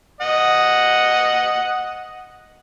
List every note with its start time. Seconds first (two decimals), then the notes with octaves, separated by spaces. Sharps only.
0.21 D#5 F#5